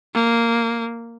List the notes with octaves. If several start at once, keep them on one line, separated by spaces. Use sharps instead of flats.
A#3